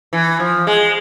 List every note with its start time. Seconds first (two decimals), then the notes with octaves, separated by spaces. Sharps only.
0.13 E3
0.40 F3
0.67 G#3